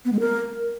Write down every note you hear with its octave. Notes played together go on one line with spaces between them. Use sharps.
B3
G#3
A#4